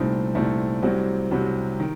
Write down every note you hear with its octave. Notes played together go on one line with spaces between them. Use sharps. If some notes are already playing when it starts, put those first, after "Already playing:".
Already playing: C2 A#2 A3 C4 D#4
C2 A#2 A3 C4 D#4
C2 C3 F#3 C4 F#4
C2 C3 F#3 C4 F#4
D#3